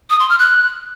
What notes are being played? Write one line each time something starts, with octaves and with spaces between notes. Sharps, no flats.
D#6
C6
F6
F#6